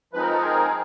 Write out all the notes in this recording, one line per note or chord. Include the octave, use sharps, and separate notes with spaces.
F3 G#3 C4 D#4 B4
A#4
A4
G#4 A#4